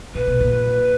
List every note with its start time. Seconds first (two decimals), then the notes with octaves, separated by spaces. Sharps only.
0.15 A#2 B4
0.27 B2
0.40 A#2